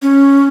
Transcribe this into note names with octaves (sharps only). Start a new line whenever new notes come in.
C#4